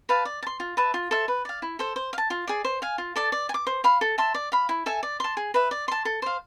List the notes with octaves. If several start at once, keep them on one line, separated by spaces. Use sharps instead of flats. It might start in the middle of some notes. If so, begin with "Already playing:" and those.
B4 F5 A5
D5
A5
C6
F4
B4 E5 A5
F4
A4 C5 E5
B4
D5 F5
E4
A4 C5
C5
F5
A5
F4
G#4 D5
C5
F5 G#5
F4
A4 D5 A5
D5
G#5
D6
C5
F5 B5
A4
E5 A5 C6
D5
F5 B5
E4
A4 E5 G#5
D5
A5 C6
G#4
B4 E5
D5
A5 C6
A4
C5 F5